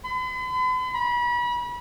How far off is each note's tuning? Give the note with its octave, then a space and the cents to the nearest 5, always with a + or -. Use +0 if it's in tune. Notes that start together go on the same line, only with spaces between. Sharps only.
B5 +45
B5 -35